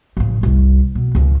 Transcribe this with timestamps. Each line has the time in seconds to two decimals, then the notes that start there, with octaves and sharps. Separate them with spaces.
0.17 A1 C#3
0.41 F#1 C2
0.95 B2
1.15 C#2 C#4